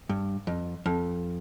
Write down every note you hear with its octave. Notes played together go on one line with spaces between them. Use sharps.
G2
F2
F2